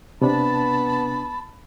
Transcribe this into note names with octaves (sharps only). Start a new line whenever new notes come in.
C3 B3 D4 A5 B5